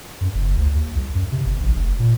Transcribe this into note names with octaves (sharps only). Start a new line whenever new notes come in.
F#2
F#1
D2
D#2
C2
F#2
C3
G1
A#1
F1
A#2